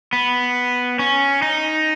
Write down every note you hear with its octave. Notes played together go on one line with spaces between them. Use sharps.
B3
C#4
D#4